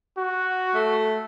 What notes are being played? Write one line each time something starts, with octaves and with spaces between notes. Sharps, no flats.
F#4
A3